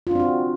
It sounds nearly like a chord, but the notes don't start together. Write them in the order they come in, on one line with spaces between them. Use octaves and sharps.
F4 D4 C4 F#4